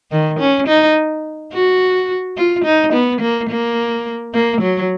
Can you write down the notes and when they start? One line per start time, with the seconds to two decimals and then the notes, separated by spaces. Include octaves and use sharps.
0.11 D#3
0.40 C#4
0.68 D#4
1.53 F#4
2.37 F4
2.65 D#4
2.93 B3
3.21 A#3
3.50 A#3
4.34 A#3
4.61 F#3